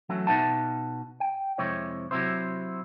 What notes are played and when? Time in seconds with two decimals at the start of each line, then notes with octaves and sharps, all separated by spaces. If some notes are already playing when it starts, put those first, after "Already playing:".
0.09 E3 F#3 A3 C#4
0.27 B2 D#4 B4 E5 F#5 A5
1.20 G5
1.58 F2 C3 G#3 E4 C5 C#5
2.11 C3 F#3 C4 E4 C5